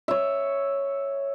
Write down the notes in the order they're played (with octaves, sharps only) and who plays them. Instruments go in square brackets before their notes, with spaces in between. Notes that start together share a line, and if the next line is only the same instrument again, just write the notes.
[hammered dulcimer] C#5 E5